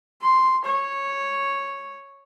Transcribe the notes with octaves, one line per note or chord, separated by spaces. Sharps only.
C6
C#5